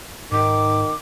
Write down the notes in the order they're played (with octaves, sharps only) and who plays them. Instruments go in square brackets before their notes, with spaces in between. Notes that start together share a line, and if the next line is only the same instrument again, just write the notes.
[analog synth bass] G#2 [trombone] D#3 [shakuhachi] D6